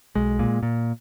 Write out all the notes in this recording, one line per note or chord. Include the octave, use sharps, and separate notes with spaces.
B1 G#3
A#2
A#2